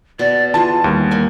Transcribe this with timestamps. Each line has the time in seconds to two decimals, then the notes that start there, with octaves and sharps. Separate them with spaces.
0.19 B2 D5
0.54 E3 F4 G#4 A5
0.84 D#2 G3
1.11 A#3 G#5